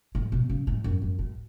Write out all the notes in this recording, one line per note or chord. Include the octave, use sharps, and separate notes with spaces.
A2
B2
C#3
A2
F#2
F#2
A2